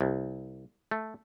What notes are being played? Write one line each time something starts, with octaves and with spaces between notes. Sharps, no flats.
C2
A3